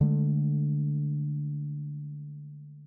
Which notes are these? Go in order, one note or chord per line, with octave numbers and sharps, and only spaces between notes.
D3 G#3 A3